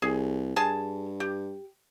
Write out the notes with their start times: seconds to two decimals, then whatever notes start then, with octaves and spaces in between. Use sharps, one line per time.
0.02 C2 G#4
0.56 G2 G#4 G#5 A5
1.20 G4